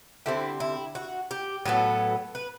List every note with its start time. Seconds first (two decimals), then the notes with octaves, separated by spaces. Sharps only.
0.26 D3 G3 C4 E4
0.60 E4
0.95 F#4
1.31 G4
1.65 A2 F#3 B3 A4
2.35 B4